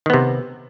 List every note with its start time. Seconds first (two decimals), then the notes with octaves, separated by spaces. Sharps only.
0.06 D#3
0.10 B3
0.14 C3